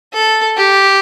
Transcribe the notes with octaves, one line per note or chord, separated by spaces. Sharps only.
A4
G4